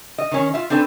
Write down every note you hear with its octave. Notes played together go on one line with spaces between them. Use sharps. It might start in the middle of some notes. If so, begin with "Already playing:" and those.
D#5
D#3 C#4
F4 E5
C4 D4 A4 B4